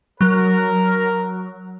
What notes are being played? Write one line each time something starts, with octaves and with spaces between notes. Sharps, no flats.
F#3 A#4